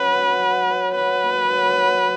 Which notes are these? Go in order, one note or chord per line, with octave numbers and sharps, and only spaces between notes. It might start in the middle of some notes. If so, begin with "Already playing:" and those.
Already playing: F#3 C#4 B4 C#5
F#4
F#4
C#5
F#3 B4
A#3
F#3
F#3